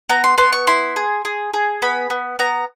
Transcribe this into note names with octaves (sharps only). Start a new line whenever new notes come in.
B3 A#5
C6
B3 C6
C#6
E4 C6
G#4
G#4
G#4
B3 B5
B3
B3 A#5